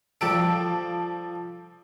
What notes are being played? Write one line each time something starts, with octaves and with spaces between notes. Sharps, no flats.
F3 G3 G4 A4 A5 D7